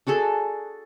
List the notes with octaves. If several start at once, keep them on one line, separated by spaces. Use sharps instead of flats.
D4 F#4 G#4 A4